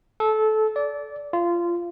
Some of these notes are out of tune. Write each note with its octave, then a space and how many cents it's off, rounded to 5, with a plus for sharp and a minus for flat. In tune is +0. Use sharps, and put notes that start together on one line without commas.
A4 -20
D5 -20
F4 -20